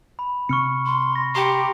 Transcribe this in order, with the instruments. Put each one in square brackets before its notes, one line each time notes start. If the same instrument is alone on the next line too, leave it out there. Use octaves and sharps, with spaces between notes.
[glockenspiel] B5
[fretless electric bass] C3 C4 [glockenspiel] C#6 F6 C#7
[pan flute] C6
[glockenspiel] B5 A#6
[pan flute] G4 [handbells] G5 A#5 C6 [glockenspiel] C7 C#7